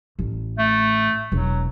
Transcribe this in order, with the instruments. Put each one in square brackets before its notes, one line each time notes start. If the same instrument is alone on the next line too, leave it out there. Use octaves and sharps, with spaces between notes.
[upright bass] A1
[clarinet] A3
[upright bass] E1 [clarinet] F#3